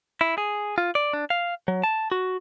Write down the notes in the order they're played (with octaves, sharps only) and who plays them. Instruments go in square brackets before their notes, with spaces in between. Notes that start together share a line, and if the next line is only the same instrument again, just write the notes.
[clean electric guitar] E4
G#4
F4
D5
D4
F5
F#3
A5
F#4